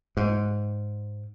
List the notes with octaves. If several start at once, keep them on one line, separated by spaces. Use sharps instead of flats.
G#2